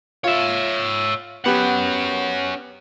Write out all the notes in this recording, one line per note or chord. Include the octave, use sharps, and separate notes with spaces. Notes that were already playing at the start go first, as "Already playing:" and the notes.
F4 C#5 E5
B3 C#4 G4 F#5